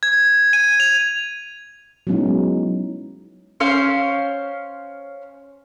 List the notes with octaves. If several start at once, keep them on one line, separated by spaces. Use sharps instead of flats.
G#6
D#7
F7
F#3 G#3 B3 C#4 D#4 E4
C#4 C5 F5